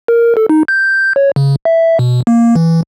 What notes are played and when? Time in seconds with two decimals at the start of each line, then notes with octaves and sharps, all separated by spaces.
0.08 A#4
0.37 A4
0.49 D#4
0.68 G6
1.16 C#5
1.36 C#3
1.65 E5
1.99 B2
2.27 A#3
2.56 E3